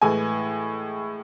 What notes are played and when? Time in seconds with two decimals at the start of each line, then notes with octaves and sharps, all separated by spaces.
0.02 A2 E3 G#3 G#5